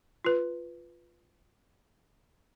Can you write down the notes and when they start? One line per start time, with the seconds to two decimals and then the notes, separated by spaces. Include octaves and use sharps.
0.25 F4 B4